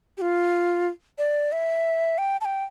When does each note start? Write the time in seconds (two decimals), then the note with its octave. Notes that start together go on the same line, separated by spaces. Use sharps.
0.17 G4
0.21 F4
1.18 D5
1.52 E5
2.18 G5
2.41 A5
2.45 G5